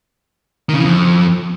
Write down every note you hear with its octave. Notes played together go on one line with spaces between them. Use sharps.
D#3
C#3
E3
F2